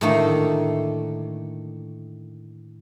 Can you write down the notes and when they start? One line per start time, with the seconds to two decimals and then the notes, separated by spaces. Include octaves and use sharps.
0.01 A2 D3 D#3 A3 A#3